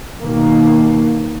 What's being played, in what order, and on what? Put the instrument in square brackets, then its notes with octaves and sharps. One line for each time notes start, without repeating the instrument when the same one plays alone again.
[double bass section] B2 D#3 A#3